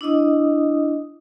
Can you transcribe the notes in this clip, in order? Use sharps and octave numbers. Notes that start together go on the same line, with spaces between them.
D4 E4 D#5 D#6